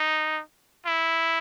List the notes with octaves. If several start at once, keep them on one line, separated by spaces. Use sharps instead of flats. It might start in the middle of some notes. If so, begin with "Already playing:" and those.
Already playing: D#4
E4